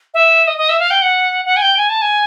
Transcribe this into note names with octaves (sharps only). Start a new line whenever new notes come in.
E5
D#5
D#5
E5
F5
G5
F#5
F#5
G#5
G5
G#5
A5
G#5